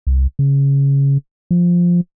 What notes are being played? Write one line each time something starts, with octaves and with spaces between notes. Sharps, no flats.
C2
C#3
F3